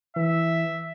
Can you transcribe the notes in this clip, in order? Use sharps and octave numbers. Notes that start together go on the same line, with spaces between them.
E3 E5